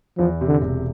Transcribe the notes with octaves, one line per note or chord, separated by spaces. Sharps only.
E2 F3
C3
D3
E1